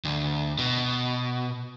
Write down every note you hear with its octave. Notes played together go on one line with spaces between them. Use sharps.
D2
B2